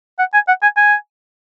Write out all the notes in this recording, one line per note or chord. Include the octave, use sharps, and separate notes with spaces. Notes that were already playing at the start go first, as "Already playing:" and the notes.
F#5
G#5
F#5
G#5
G#5